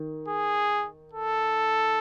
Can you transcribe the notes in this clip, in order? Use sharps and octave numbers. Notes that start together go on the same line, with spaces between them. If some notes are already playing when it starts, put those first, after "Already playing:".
Already playing: D#3
G#4
A4